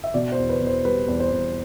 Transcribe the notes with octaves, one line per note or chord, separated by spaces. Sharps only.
E5
B2 D5
C5
E2
B4
B2
C5
G3 B4
E2
C5
E2